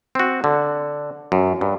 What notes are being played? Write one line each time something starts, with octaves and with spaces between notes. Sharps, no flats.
C4 F#4
D3
F#2
G2